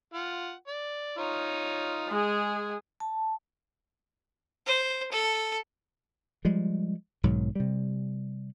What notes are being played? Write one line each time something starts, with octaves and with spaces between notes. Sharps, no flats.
F4 F#5
D5
D#4 F4 C#5
G#3 G#4
A5
C5
A4
F3 G3 G#3
B1 G#2 D#3 F#3
C3 G3